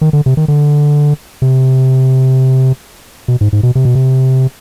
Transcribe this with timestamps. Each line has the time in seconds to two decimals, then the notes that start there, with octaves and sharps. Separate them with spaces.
0.01 D#3
0.13 D3
0.26 C3
0.37 D#3
0.48 D3
1.42 C3
3.28 B2
3.41 G#2
3.53 G#2
3.63 B2
3.75 C3
3.85 B2
3.95 C3